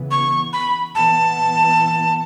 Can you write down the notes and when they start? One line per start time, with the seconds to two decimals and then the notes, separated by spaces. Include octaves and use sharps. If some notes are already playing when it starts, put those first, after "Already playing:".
Already playing: C#3 E3 B3
0.11 C#6
0.53 B5
0.95 E3 B3 A5